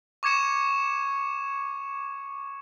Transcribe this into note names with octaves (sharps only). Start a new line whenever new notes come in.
C#6 D6 G#6 C#7 E7